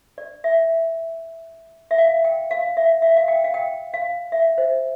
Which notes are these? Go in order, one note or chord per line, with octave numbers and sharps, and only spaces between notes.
D5
E5
E5
F5
G5
F5
E5
E5
F5
G5
F5
G5
F5
E5
C5